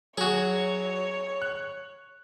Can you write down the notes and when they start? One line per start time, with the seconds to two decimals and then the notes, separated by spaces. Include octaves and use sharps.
0.18 F#3 F#4 G#4 C#5
1.42 F#6